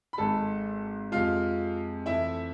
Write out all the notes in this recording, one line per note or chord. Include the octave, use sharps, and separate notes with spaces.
B5
G#1 G#2 G#3 A4 A5
F2 C3 G#3 F4 F5
F2 E3 A3 E4 E5